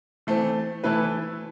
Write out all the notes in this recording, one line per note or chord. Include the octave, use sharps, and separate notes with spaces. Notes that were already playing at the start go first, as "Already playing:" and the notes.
E3 A3 C4
E3 A3 E4 B4